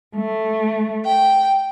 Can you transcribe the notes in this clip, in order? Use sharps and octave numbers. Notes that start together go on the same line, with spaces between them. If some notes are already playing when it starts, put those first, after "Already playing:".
A3
G5